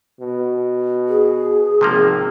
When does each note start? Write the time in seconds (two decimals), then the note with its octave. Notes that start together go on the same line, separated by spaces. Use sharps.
0.20 B2
1.09 G#4
1.81 G#1 C3 F3 A#3